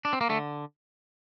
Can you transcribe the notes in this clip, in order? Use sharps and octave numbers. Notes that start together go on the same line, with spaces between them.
D4
C4
A#3
D3 A3